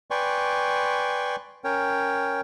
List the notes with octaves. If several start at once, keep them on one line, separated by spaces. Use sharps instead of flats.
B4 D5 G5 G#5 C6 C#6
C#4 A#4 C#5 G5